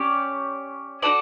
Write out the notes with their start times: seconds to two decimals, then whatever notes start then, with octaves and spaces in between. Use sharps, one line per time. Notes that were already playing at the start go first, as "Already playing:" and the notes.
Already playing: C#4 G4 D5
1.02 D#4 F#4 A4 D5